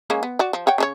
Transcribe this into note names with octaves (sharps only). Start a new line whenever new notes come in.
G#3 A#3 C#4
B3
F#4 D5
F3
C#5 F#5 G5
C#3 C#4 C#5